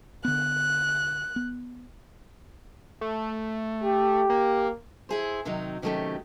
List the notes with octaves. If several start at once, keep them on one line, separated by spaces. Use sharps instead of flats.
D3 B3 F#6
B3
A3
G4
A#3
E4 G#4 C5
C3 D#3 F#3 C4 D#4
C3 D#3 F#3 A3 C#4 G4